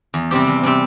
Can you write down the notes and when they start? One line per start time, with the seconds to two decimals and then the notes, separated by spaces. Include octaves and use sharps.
0.14 E2
0.31 C3 G3 C4 G4
0.47 E2
0.64 C3 G3 C4 G4